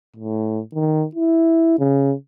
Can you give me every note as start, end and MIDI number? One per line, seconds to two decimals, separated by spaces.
0.16 0.60 45
0.74 1.05 51
1.15 1.74 64
1.79 2.13 49